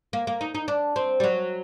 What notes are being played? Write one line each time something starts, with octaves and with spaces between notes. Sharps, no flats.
A#3
A#3
D#4
D#4
D4
C4
G3
F#3